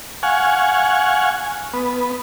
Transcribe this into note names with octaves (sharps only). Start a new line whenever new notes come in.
F5 F#5 G#5 C#6
B3